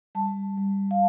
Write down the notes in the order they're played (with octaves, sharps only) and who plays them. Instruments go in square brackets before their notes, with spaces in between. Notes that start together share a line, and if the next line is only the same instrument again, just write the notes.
[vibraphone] G3 A5
G3
F5